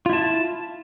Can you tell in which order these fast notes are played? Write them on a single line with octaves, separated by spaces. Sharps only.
F4 E4 A5